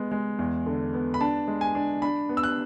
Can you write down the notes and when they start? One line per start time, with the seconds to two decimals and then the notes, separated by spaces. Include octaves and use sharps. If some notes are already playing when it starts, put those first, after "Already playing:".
Already playing: G#3 B3
0.12 G#3
0.39 E2
0.66 D3
0.94 B3
1.14 B5
1.21 D4 A5
1.48 G#3
1.61 G#5
1.75 D4
2.02 D4 B5
2.29 B3
2.37 E6
2.43 F#6